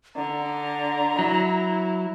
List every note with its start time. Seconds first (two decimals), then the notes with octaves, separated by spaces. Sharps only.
0.16 D3 A#5
1.19 F#3 E4